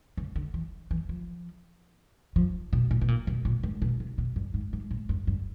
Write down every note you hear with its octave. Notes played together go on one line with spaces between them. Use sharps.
C#3
D3
E3
E3
F3
F3
B2
A#2
B2
A#2
B2
A#2
G#2
B2
C3
B2
G2
G#2
G#2
A2
G2
G2